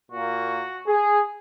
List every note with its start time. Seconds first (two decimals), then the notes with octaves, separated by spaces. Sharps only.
0.11 A#2 A#3 F#4
0.87 G#4